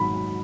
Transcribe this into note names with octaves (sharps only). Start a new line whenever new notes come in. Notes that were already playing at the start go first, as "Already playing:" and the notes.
Already playing: G#2 F#3 B5